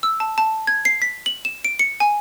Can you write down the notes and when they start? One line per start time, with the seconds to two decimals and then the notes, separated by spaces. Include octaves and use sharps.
0.03 E6
0.20 A5
0.38 A5
0.67 G#6
0.85 C7
1.02 B6
1.26 F#7
1.45 E7
1.65 D7
1.79 C#7
2.00 G#5